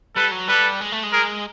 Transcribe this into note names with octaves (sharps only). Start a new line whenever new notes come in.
G3 A4 B4
F#3
G3 A4 B4
G#3
A3
G#3
G#4 A#4